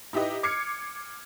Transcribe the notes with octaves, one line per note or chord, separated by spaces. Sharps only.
D#4 E4 G4 B4 D#5
D6 F6 G#6 C7 C#7